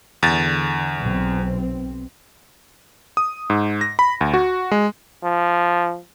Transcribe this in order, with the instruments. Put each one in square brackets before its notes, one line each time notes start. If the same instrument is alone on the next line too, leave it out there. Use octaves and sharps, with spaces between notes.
[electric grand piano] E2 A6 [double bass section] D3
[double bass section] B1 C4
[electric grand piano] D#6
G#2
A#6
B5
D2
F#4
G#3
[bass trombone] F3